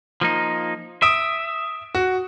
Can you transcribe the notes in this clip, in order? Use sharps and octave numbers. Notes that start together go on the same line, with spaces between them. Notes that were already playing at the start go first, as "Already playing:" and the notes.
F3 A#3 D#4
E5 D#6 D7
F#4